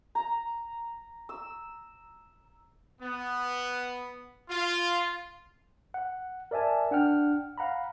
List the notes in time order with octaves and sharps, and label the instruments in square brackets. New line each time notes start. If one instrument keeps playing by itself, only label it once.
[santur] A#5
E6
[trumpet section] B3
F4
[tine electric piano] F#5
A#4 D5 E5 G#5 A5
D4 F#5 G5 F6
F5 F#5 A#5 B5